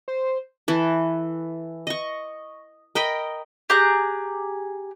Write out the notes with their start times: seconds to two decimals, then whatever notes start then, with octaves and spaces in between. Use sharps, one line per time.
0.08 C5
0.68 E3 A4
1.87 D#5 C#6
2.95 A#4 D#5 G5 B5
3.70 G4 G#4 A#5 F#6